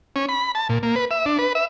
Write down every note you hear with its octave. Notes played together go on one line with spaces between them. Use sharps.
C#4
B5
A5
A#2
A#3
B4
E5
D4
B4
E5